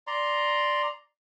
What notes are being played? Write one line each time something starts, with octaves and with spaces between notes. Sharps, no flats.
D5 A#5 C6